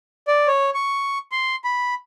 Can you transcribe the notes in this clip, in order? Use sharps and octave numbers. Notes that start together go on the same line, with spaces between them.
D5
C#5
C#6
C6
B5